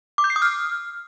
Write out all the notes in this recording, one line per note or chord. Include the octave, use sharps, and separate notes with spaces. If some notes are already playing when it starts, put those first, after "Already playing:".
D6
G6
C7
D#6
F6